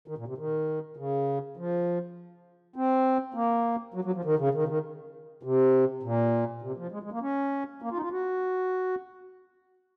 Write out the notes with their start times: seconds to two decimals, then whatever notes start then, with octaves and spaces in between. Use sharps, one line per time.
0.08 D#3
0.18 A#2
0.27 C3
0.38 D#3
0.97 C#3
1.57 F3
2.76 C4
3.34 A#3
3.94 F#3
4.04 F#3
4.14 F3
4.25 D#3
4.39 C#3
4.54 D#3
4.63 C#3
4.68 D#3
5.43 C3
6.03 A#2
6.62 C3
6.77 F3
6.92 G#3
7.03 G#3
7.12 A#3
7.22 C#4
7.82 A#3
7.91 F4
7.96 D#4
8.02 F4
8.12 F#4